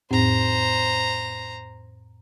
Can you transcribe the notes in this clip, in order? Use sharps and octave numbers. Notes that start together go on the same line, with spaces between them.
F2 A2 C4 C5 A#5